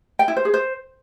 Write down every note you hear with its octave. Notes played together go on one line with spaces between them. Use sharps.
G5
E4
C5
G#4
C5